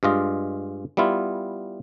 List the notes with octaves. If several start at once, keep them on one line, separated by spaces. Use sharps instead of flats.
G2 G#3 F4 D#5
G3 B3 E4 F4